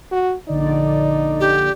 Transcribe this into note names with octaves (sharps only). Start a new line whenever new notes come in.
F#4
A#1 D3 D#4 D5
G4